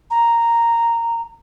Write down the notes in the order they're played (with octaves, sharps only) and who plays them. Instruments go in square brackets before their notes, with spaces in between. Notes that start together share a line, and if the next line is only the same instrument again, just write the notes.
[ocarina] A#5